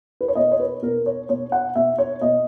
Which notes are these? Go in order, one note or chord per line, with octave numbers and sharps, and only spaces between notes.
B4
C#5
B2 D#5
C#5
B4
B2 A#4
C#5
B2 C#5
F#5
B2 E5
C#5
B2 D#5